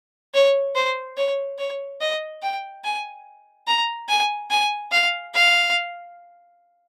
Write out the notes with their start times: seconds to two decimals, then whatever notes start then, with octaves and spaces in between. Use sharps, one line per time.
0.34 C#5
0.75 C5
1.17 C#5
1.59 C#5
2.01 D#5
2.42 G5
2.84 G#5
3.68 A#5
4.09 G#5
4.51 G#5
4.92 F5
5.35 F5